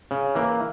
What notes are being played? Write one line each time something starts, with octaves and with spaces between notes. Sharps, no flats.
C#3
E3 A#3